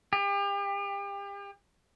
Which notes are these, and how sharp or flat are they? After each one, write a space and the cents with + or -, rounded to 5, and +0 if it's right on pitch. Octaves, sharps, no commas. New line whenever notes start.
G4 +35